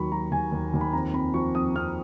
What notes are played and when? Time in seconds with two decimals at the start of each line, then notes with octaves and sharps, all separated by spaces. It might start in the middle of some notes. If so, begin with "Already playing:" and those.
Already playing: D#2 F#3 B5 C#6
0.11 F#3 A#5
0.31 D#2 G#5
0.52 D#2
0.73 D#2
0.81 B5
0.93 F2 A#5
1.13 F2 B5
1.34 F3 C#6
1.55 F2 D#6
1.76 F2 F6